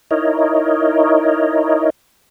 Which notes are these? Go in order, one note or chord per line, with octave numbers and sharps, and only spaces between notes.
D#4 E4 A#4 C#5 D#5